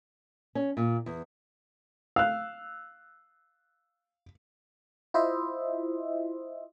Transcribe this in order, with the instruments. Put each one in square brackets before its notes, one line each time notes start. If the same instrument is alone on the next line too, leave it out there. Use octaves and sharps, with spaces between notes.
[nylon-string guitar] C#4
A#2
E2
[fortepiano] F5 [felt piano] E6 F#6
[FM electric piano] E4 F4 C5 D#5 E5